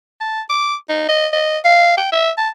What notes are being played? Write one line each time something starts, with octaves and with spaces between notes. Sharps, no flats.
A5
D6
D#4
D#5
D#5
F5
G5
E5
A5